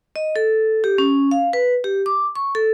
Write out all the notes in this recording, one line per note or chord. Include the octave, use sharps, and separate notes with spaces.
D#5
A4
G4
C#4
F5
B4
G4
D6
C#6
A4